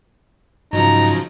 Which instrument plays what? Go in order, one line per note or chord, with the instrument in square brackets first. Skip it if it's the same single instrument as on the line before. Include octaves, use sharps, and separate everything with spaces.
[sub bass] G#2 [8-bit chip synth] C#3 F3 F#3 [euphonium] D#4 [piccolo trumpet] A#5